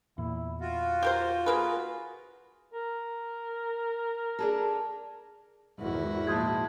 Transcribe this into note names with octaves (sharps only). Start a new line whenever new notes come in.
E2 A#2 E4
F4 F#4 F5
G4 A#4 C5
A#3 G#4 A#4 B4
A#4
D4 G#4 A4
G#1 E2 E4 F#4
A#2 F3 G#3 A5 G6 G#6